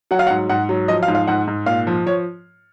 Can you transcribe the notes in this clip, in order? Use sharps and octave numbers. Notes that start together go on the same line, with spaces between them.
F#3 F#5
F5
F#5
G#2
G#2 F#5
F#3
F3 D#5
F5
G#2
F5
G#2 F#5
G#2
A#2 F5
F3
F3 C#5